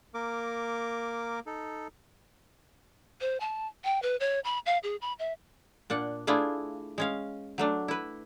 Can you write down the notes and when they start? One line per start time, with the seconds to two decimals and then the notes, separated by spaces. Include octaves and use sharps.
0.14 A#3 A#4 D6
1.46 D#4 A4
3.21 C5
3.40 A5
3.84 G5
4.02 B4
4.20 C#5
4.44 B5
4.66 F5
4.83 G#4
5.01 B5
5.19 E5
5.90 A#2 D4 F#5
6.27 A3 D4 E4 F4 G#4
6.98 G#3 C#4 F5
7.58 F#3 A3 D4
7.88 E4 B4